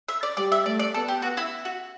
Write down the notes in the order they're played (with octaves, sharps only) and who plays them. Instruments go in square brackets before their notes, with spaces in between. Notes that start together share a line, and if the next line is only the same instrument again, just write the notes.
[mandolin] E5
D5
[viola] G3 [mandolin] D5
[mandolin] E5
[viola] A3 [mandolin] D5
[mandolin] D5
[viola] B3 [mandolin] A4
[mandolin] G4
F#4
E4
F#4